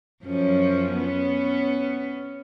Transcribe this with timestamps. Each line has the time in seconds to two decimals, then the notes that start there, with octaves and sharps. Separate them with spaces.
0.24 F#2 F3 C#4
0.93 B3 C#4